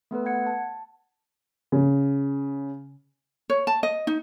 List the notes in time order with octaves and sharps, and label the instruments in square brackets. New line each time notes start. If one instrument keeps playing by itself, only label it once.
[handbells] A3 B3 A4 B4
F#5 G#6 C#7
A5
[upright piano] C#3
[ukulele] C#5
A5
D#5
D#4